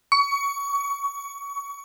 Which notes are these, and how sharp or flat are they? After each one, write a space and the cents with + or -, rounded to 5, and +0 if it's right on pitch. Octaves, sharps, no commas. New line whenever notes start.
C#6 +25